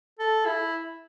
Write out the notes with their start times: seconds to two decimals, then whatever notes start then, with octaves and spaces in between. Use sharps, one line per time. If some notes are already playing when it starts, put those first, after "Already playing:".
0.19 A4
0.46 E4